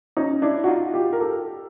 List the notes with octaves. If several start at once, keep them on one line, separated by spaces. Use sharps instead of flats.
C#4 D#4
D4 E4
F#4
D#4 F4
F4 G4
A#4
G4 A4